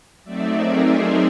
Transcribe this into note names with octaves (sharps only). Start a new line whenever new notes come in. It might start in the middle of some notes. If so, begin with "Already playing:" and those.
F#3 A3 C4 D#4 D5 E5
G#4 A#4
A#4 C5